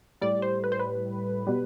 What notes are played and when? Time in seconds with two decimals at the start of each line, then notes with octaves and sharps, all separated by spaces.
0.21 A2 G3 D5
0.42 C5
0.64 B4
0.72 C5
0.80 B4
1.47 B2 G3